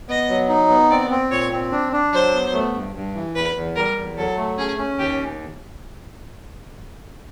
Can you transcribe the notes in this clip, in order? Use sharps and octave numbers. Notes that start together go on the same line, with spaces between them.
B3 D#5
F#3
D#4
B3
C4 D5
C4
A#2 C#5
C4
D4
D4
F#3 C5
B3
A3
G2
G2
E3
E2 B4
E2
G3 A#4
E2
F#3 A4
A3
C#4 G#4
C#4
D#2 G4